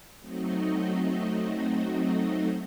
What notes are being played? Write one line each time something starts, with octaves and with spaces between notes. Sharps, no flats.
F#3 A3 C4 D#4 F#4 D#5